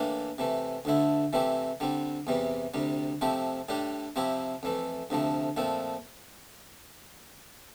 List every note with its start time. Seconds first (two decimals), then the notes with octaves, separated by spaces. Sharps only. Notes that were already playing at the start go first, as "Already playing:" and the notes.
Already playing: A2 E3 A#3 D4
0.38 C3 E3 A3
0.85 D2 D3 A3 E4
1.33 C3 E3 A3 C4 G4
1.80 D3 G3 C4
2.27 E2 C3 E3 G3
2.74 D2 C3 G3
3.21 C3 F3 A3 C4 G4
3.69 A2 G3 D4 G4
4.16 C3 F3 C4 E4 G4
4.63 F2 E3 A3
5.10 D2 C3 F3 A3
5.57 A#2 F3 A3 C4